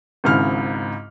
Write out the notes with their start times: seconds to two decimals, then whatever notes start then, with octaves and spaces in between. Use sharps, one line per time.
0.24 G#1 C#2 G#2 E4 F6